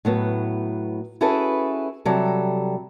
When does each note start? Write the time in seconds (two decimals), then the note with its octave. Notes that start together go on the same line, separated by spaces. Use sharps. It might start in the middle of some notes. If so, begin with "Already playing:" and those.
0.05 A2 F#3 B3
1.21 C#4 E4 F#4 G#4 A4 B4
2.05 C3 F#3 G3 A4